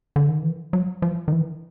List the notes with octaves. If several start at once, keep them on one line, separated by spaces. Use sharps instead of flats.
D3
D#3
E3
F#3
F3
D#3
E3